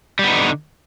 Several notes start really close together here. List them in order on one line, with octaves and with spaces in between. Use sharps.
G3 B3 D#4 D3